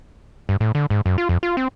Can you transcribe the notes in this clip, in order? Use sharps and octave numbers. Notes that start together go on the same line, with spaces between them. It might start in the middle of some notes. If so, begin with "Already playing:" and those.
G2
A2
D3
G#2
F#2
F4
F2
F4
C4